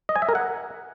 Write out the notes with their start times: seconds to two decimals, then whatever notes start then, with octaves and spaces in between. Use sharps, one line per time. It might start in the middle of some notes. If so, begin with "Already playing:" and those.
0.09 D#5
0.16 G#5
0.22 E5
0.29 A#4
0.35 F#5